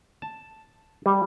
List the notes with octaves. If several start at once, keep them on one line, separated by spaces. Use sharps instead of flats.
A5
G3